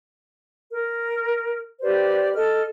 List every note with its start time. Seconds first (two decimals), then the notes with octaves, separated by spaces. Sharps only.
0.69 A#4
1.81 G4 B4 C5 D5
2.34 A4 D#5 F6